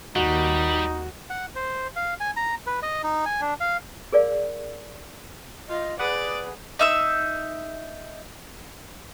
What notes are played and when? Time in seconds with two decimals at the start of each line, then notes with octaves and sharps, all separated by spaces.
0.16 D#2 G3 D#4 F#4
1.30 F#5
1.55 C5
1.96 F5
2.20 G#5
2.36 A#5
2.67 B4
2.83 D#5
3.04 D#4
3.26 G#5
3.41 D4
3.61 F5
4.12 G#4 A#4 D5 F5
5.69 F4 D#5
5.99 G#4 B4 D5 F#5 B5 D#6
6.79 D#4 E5 E6